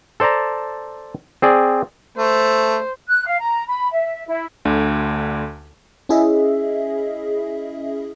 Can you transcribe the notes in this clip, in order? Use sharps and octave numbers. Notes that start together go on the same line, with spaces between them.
A4 C5 D5 A5 A#5
C4 G#4 D5
A3 C5
F#6
F5
A#5
B5
E5
E4
D2 D3
C#4 E4 G#4 D#5 E5